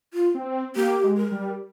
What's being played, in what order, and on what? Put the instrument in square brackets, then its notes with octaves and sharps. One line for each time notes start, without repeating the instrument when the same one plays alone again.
[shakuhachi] F4
[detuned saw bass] C4
[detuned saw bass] A#3 [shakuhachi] G4
[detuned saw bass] G#3
[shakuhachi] A#4
[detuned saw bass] G3